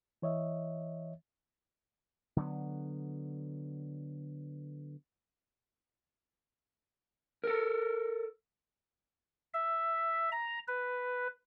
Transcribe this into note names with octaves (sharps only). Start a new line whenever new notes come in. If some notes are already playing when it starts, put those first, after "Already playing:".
E3 C#5 D#5 E5
D3 F#3 B3
A4 A#4
E5
A#5
B4